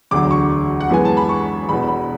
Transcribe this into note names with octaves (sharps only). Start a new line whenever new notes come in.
E1 D2 D3 F#3 D6
C#6
F#5
F#2 E3 G#3 B3 G#5
A5
B5
C#6
E1 E2 B2 B5
B5